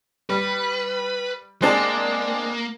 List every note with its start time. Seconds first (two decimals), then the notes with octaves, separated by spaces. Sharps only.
0.30 G3 B4
1.62 G#3 A#3 C4 D4